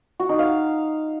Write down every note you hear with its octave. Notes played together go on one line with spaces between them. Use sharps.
F#4
D#4
F5